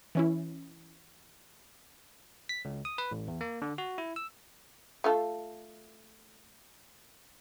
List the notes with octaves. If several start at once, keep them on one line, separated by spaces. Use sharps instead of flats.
E3 C#4 E4
B6
C#2
D#6
B4
A1
E2
A#3
D3
F#4
E4
E6
A3 F4 A4